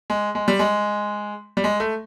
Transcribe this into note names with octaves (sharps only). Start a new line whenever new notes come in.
G#3
G#3
G3
G#3
G3
G#3
A3